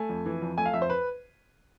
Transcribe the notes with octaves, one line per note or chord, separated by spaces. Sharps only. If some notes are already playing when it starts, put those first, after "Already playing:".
Already playing: A3 G#5
F2
E3
F2
A3 G#5
F5
F2 E5
C5
B4